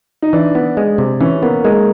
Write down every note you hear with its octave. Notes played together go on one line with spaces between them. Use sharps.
D#4
E3 D4
B3
G#3
C3
E3 C#4
A#3 B3
G#3 A#3